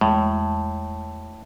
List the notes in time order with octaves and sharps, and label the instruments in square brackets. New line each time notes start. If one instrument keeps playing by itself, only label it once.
[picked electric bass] E2 G#3 [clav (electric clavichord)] A2